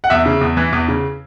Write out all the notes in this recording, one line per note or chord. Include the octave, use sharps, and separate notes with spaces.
F#5
E2 E5
C#3
E2
E3
E2
C#3